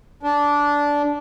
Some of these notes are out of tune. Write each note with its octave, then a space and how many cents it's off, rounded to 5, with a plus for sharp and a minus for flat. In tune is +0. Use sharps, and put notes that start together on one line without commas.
D4 -15